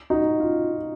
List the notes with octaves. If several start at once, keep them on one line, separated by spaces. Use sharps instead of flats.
D#4 F#4
F4